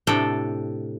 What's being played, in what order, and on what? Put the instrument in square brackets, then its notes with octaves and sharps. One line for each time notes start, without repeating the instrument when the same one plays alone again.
[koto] A2 C3 D4 A4 G5